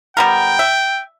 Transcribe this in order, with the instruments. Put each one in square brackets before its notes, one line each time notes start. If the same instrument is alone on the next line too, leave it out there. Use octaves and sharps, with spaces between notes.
[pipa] G3 B3 A#4 [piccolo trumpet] G5
[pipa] E5